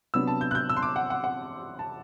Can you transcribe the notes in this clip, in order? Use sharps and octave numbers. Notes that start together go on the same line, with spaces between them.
C3 F#3 B3 D4 E6
A5
G6
F#6
G6
E6
C6
D6
F#5
F#5
F#5
A5